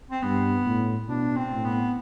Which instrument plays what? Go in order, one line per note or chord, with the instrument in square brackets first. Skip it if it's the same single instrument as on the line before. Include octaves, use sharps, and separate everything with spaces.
[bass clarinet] C4
[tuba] G2 [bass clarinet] B3
[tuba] A2
[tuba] B2 [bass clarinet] D4
[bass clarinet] C4
[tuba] A2
[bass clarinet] B3